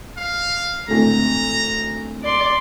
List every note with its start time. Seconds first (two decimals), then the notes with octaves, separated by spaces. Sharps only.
0.17 F5
0.88 G#1 D2 A2 A#5
2.24 D5 C6